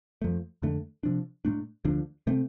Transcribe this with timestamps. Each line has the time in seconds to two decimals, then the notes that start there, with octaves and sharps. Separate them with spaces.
0.22 F2 F3 A3
0.62 F2 D3 A3
1.03 C3 F3 D4
1.45 A2 A3 D4
1.85 D2 D3 F3 D4
2.27 C3 A3 C4